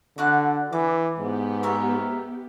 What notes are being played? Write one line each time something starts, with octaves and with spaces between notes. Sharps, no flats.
D3 F#4 D5 F#6
E3 D6
G#2 B3 G4
A#4 C#5 E5